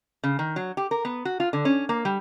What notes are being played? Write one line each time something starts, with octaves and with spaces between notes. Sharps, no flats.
C#3
D#3
F#3
G4
A#4
B3
F#4
F4
D3
C#4
A#3
G3